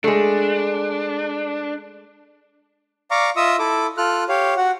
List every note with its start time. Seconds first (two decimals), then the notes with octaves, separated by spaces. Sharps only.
0.04 G#3 A3 D4
3.11 D5 F5 A#5 C#6 D6
3.37 F4 D#5 E5 D#6 E6
3.59 E4 A4 D6
3.97 F4 A4 F6 F#6
4.29 G4 C#5 F5
4.57 F#4 F#5